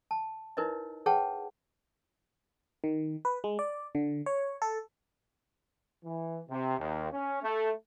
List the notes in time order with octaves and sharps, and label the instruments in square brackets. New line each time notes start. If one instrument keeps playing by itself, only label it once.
[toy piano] A5
D#4 E4 A#4 B4 C#5 D#5
G#4 B4 C#5 F#5 G5 A5
[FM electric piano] D#3
B4
G#3
D5
D3
C#5
A4
[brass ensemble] E3
C3
D#2
C#4
A3